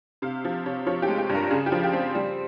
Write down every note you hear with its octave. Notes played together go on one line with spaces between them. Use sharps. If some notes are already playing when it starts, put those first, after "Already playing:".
C3 F5
F3
C3 C#5
F3 C#5
G4
G#3
G4
G2
A#4
C#3 G#4
G4
F3
G4
C4
G3